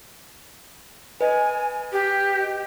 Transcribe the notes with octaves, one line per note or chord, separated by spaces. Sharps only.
B4 D#5 G#5
G4